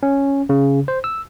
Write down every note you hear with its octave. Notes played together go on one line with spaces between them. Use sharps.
C#4
C#3
C5
E6